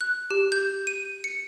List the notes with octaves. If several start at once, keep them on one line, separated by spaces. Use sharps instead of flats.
F#6
G4
G6
D#7
C#7